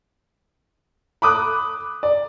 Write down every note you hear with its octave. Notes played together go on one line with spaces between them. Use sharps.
B5 D6 D#6 F#6
D5